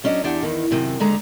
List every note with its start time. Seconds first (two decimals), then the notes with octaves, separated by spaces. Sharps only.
0.04 F#3 C#4 D4 D#5
0.24 E2 D4 G4 F#5
0.42 E2 D#3
0.70 F#2 C3 D#3
1.00 D#2 D3 G#3 A#5